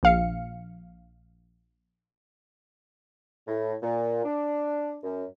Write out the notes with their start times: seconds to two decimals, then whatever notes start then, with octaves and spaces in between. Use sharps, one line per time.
0.03 A#1 F5 C#7
3.47 A2
3.82 A#2
4.24 D4
5.03 F#2